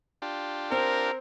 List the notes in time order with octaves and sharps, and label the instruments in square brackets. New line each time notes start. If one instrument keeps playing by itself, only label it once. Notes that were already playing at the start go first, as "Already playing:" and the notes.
[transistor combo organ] D4 F4 G4
[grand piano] C4 [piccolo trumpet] A#4